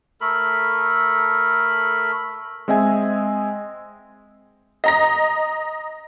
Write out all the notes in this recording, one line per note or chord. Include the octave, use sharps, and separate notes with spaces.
A3 A4 A#4 B5
G#3 C4 D#5 E5 G#5
D#5 A#5 A#6